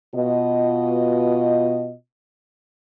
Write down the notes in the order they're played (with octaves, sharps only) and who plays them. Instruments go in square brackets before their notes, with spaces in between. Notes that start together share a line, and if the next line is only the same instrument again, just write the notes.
[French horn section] B2 F4 D#5